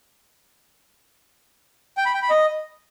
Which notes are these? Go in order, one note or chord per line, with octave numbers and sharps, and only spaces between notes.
G5
B5
G5
B5
D#5